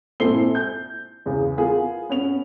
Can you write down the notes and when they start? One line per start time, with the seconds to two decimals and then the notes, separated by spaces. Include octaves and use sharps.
0.20 A#1 C4 E4 A4 C7 G7
0.55 G6
1.26 E2 C#3
1.57 B3 F4 G#4 A#4
2.09 B3 C#4 F7